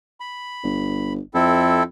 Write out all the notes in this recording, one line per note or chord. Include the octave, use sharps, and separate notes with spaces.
B5
G1
F2 C4 E4 A4